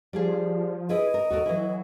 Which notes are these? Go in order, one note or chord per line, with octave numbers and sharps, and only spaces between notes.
F3 G3 D4 G#4
E4 G#4 B4 D#5
A#4
D#2 F#4 A4 A#4
E3 F#3 E4